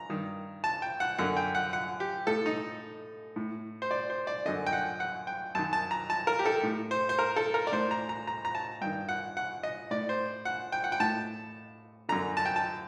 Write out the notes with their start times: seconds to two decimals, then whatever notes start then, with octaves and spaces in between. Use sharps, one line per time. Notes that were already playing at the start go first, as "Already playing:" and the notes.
Already playing: A#5
0.09 G2 D#3
0.64 A5
0.82 G5
1.00 F#5
1.18 F#2 D3 F#5
1.37 G5
1.55 F#5
1.73 F#5
2.00 G4
2.27 A2 A4
2.46 D#4
3.36 A2
3.82 C5
3.91 D5
4.10 C5
4.27 D5
4.45 F#2 D3 D#5
4.66 G5
4.73 F#5
5.00 F#5
5.27 G5
5.55 F#2 D#3 A5
5.73 A5
5.91 A#5
6.10 A5
6.27 A#4
6.39 G4
6.46 A4
6.63 A2
6.91 C5
7.09 C5
7.19 A#4
7.36 A4
7.54 A#4
7.67 D5
7.72 A2 C5
7.91 A#5
8.09 A#5
8.27 A#5
8.45 A#5
8.55 A5
8.81 G2 D#3 G5
9.09 F#5
9.37 F#5
9.63 D#5
9.91 A2 D5
10.09 C5
10.45 F#5
10.72 G5
10.84 F#5
10.92 G5
11.00 A2 A5
12.09 F#2 D3 A#5
12.37 A5
12.45 G5
12.56 A5